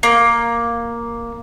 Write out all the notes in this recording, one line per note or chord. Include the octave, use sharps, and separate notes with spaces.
A#3